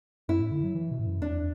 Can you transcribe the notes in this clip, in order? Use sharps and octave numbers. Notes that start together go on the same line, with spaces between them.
F#2 E4
A2
D3
F#3
E3
B2
A2
F#2
E2 D4